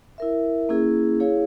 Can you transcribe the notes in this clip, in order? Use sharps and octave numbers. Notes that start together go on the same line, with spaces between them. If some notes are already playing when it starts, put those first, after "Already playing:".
E4 A#4 E5
A#3 C#4 E4 G#4
E4 G#4 C#5 F5